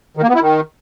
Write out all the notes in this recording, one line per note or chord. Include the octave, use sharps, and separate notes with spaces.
D#3
A#3
B3
E4
D#3